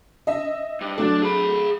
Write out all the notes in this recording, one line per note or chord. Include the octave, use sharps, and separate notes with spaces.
D#5 E5
G2
F#3 A3 D4
G#4 B5